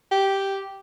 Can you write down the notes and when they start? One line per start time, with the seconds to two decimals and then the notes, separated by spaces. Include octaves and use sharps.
0.11 G4